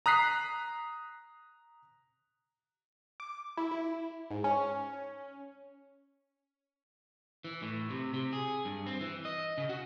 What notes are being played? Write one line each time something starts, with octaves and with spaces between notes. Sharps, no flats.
A#5 D#6 F#6 B6 C7
D6
E4
E4
G#2
C#4
E3
A2
C3
C3
G#4
G2
C4
E3
D#5
C#3
F#4